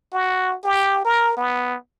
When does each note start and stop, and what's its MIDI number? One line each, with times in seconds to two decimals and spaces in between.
0.13 0.56 66
0.64 1.02 67
1.05 1.32 70
1.37 1.76 59